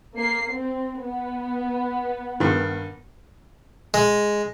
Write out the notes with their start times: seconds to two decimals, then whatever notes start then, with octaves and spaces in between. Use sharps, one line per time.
0.17 A#3 C7
0.52 C4
1.02 B3
2.40 G2 D#3
3.94 G#3